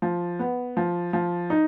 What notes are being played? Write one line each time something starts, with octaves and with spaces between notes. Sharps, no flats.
F3
B3
F3
F3
D#4